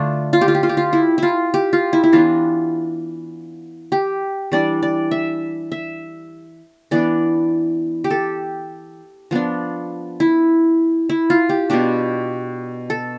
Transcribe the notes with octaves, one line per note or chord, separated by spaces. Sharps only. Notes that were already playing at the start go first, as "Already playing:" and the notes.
Already playing: D3 A3 D4 F4
F4
G4
F4
G4
F4
G4
F4
E4
E4 F4
G4
F4
E4
E4
E3 B3 D4 F4
G4
E3 G3 D4 D5
D5
E5
E5
E3 B3 D4 D5
G4
A4
F3 B3 D4
E4
E4
F4
G4
B2 B3 D4 G4
A4